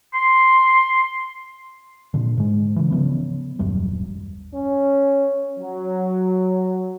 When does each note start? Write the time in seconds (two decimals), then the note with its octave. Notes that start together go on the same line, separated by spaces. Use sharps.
0.14 C6
2.14 A#2 D3
2.37 G#2 G#3
2.76 C#3 E3
2.91 C#3 F3 B3
3.59 D#1 G#1 F#2 G3
4.54 C#4
5.59 F#3